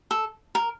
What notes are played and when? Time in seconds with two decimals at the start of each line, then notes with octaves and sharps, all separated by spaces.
0.11 A4
0.55 A#4